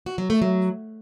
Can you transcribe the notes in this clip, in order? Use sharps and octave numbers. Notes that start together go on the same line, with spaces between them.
F#4
F#3
A3
F#3